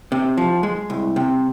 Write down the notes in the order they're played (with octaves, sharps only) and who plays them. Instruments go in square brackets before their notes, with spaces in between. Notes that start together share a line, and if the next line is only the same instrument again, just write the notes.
[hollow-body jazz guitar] C3
F3
G#3
C2
C3